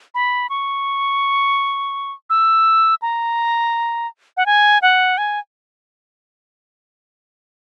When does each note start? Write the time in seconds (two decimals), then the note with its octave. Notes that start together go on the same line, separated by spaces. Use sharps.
0.15 B5
0.50 C#6
2.30 E6
3.02 A#5
4.37 F#5
4.46 G#5
4.82 F#5
5.18 G#5